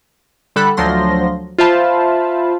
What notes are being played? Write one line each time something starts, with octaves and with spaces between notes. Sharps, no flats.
D3 G3 A4 B5 F#6
D2 F3 F#3 C6 A#6
F4 C5 E5 F5 A5 B5